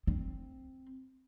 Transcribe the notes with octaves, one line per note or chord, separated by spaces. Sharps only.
C4